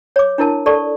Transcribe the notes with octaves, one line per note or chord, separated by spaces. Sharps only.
C#5 D6
D4 E4 A#4 A5
A4 D5 A5 C#6